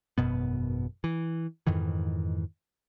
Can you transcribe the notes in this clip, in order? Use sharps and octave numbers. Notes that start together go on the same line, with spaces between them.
G#1 F#2 B2 B3
E3
F2 G#2 D#3 E3